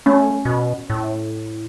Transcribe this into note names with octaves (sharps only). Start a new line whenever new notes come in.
A3 C#4
B2
A2